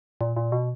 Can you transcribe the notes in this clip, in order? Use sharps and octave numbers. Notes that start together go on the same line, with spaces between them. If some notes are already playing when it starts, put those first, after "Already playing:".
A#2
A#2
B2